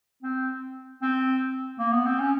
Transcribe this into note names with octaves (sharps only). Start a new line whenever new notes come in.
C4
C4
A#3
B3
C4
C#4